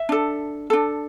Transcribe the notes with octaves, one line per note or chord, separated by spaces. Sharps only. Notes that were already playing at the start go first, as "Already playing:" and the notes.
Already playing: E5
D4 A4
D4 A4